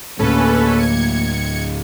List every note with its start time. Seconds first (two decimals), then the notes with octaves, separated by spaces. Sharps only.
0.19 D2 A2 A3 A#3 C#4 A4 B4
0.78 G#6 C#7